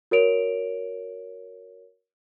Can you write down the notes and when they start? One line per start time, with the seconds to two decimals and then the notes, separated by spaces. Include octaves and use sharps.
0.11 F#4 A#4 C#5 D7 F7